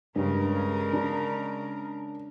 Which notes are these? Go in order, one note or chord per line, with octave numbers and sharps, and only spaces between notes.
G2 C#3 G#3 A#4
D4